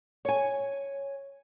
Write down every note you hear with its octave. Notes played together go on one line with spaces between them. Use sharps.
C#5 G#5